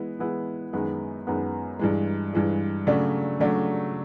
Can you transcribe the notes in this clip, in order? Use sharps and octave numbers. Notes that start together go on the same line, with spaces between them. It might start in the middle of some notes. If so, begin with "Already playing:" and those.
Already playing: E3 G#3 B3 E4
E3 G#3 B3 E4
F#2 D#3 G#3 B3
F#2 D#3 G#3 B3
G2 E3 G#3
G2 E3 G#3
C#3 F#3 A3 D4
C#3 F#3 A3 D4